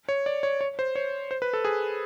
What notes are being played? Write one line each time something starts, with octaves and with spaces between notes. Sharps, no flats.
C#5
D5
C#5
C#5
C5
C#5
C5
B4
A4
G#4